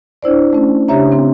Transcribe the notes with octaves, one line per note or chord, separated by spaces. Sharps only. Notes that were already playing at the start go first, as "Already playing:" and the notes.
D4 E4 C5 D5
A3 C#4
C#3 D4 G4 C#5 E5 A#5
C4